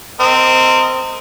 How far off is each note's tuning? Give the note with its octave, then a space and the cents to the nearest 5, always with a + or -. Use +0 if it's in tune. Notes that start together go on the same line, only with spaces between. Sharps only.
C4 -10 A#4 -35 D#5 +0